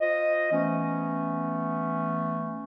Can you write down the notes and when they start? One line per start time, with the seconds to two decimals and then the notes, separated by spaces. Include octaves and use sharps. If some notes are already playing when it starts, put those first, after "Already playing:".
0.01 F4 C5 D#5
0.52 E3 A3 B3 C#4